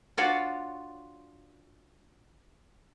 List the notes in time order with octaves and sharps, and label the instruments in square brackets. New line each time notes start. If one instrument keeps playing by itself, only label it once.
[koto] D4 F4 F#4 C#5 D5